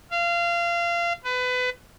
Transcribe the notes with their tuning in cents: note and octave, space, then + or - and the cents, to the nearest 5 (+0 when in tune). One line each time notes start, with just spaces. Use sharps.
F5 -25
B4 +25